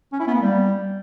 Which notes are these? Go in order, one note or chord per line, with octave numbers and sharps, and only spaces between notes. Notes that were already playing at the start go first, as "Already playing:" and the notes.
C#4
E4
B3
A#3
G3